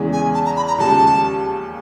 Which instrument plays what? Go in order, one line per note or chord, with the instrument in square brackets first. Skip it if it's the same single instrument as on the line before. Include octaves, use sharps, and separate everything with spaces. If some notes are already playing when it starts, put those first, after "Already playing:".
Already playing: [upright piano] E2 C#3 E3 G#3
[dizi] G#5
A5
A#5
B5
A#5
[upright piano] D#2 C#3 F3 G#3 [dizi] A5